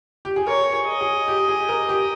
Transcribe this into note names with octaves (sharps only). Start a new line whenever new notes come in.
G4
G#4
A#4 C#5
G#4
D#5
G#4
G4
G#4
A#4
G4